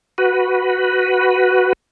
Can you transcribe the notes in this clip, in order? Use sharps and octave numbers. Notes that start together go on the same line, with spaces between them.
F#4 B4